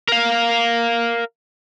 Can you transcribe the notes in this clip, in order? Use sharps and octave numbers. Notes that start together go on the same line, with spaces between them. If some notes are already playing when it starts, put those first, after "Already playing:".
A#4 F5